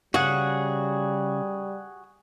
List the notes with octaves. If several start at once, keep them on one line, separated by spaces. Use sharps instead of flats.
C#3 G3 F#4 G#4 F#5